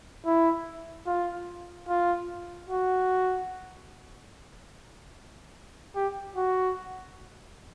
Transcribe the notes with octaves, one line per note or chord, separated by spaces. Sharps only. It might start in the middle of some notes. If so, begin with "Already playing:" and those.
E4
F4
F4
F#4
G4
F#4